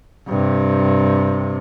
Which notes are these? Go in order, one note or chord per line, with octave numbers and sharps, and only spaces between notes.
G2 C3